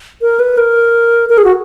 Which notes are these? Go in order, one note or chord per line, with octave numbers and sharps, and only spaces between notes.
A#4
B4
A#4
A#4
G#4
F#4